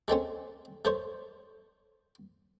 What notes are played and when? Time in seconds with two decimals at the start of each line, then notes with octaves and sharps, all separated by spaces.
0.08 G#3 A3 C4 C#4
0.85 A3 C5 C#5